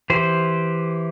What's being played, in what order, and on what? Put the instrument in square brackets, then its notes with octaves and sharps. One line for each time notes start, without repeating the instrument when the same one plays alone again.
[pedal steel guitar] E3 G4 C5